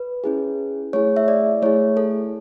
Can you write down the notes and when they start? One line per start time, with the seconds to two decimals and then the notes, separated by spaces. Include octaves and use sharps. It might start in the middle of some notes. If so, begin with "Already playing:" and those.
Already playing: B4
0.24 C#4 E4 G#4
0.93 A3 E4 G#4 C#5
1.16 E5
1.28 D5
1.62 A3 E4 G#4 C#5
1.97 A4